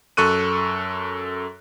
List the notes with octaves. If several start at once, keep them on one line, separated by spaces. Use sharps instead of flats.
F#2 A4 C#6 F#6 D#7